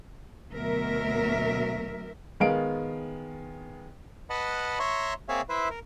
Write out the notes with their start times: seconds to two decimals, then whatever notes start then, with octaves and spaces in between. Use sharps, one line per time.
0.53 D2 B2 F#3 A#4 E5
2.40 D#3 G#3 B3 F5 D7
4.30 B4 D#5 F#5 A5 B5
4.80 C#5 E5 A#5 C6 C#6
5.29 A#3 C4 G#4 C#5 E5 F5
5.49 E4 B4 C5 E5
5.70 A#4